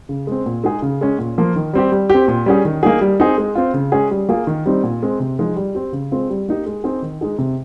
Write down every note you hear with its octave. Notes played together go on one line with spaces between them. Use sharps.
C#3
G#3 C4
A#2
G#3 D#4 G#4
C#3
G#3 C#4
A#2
F3 A#3
D#3
G3 C4 G4
G3
C4 G4
A#2
G3 C#4 G#4
D#3
A#3 D#4 G#4
G3
C4 D#4 G#4
G#3
C4 F4
C#3
G#3 C#4 G#4
G3
A#3 F4 G#4
D#3
G3 C4 D#4
A#2
G#3 C4
C3
F3 G#3 D#4
G3
C4 G4
C#3
G#3 C4 F4
G3
A#3 D#4 G4
G#3
C4 D#4 G#4
D#3
G#3 D#4 G#4
C3